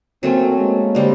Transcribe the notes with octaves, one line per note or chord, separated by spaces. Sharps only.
F#3 A3 A#3 C4 C#4
G#3 A#3
D3 G3 C4